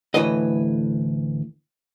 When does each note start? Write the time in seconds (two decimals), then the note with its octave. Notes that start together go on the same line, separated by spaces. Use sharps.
0.14 D2 A2 E3 B4 D#5